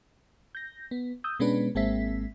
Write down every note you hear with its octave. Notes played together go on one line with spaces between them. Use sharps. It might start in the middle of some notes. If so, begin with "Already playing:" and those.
G6 A#6
B3
D#6 E6 G6
B2 G#3 B3 C#4 D4 B4
G#1 G#3 A#3 C4 E5 B6